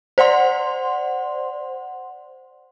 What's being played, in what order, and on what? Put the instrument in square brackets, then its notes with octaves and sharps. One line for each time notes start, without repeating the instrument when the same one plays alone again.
[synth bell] C5 D5 F#5 C6